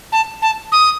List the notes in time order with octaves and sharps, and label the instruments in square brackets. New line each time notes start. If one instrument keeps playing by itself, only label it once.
[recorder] A5
A5
D#6